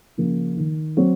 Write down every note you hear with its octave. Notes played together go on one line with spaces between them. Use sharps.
C#3 F3 A#3
D#3
F#3 C4